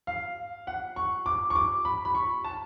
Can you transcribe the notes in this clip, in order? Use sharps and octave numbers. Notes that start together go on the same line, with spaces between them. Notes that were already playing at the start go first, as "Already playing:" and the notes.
F5
F#5
C#6
D6
C#6
D6
B5
B5
C#6
A5